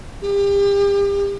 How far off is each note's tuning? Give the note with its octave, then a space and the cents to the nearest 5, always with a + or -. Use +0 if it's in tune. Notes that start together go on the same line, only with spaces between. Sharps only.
G4 +35